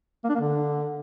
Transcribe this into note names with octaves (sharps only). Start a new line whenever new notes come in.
A#3
D4
A#3
D3